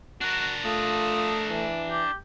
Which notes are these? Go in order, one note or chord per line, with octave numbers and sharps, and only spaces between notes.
D4 F#4 A#4
A3 F4 D#6
E3
G4